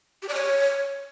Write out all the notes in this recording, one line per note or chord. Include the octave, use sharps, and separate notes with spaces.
G4
D5
C#5